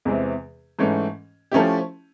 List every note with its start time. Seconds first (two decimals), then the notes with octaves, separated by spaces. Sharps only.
0.05 E2 C3 E3 G#3 C4
0.79 G#2 E3 A3 C#4
1.52 F3 A3 C#4 E4 G4